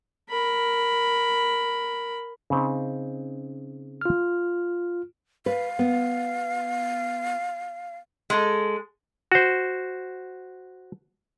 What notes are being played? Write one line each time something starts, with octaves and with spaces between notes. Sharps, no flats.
A#4 B5
C#3 C4 D#4
F4 F6
B4 F5
B3
G#3 A4
F#4 C5